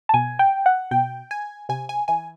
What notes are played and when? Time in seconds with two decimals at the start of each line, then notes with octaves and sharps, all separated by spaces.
0.09 A5
0.14 B2 G#5
0.39 G5
0.66 F#5
0.91 B2 G5
1.31 G#5
1.69 C3 G#5
1.89 G#5
2.08 E3 G#5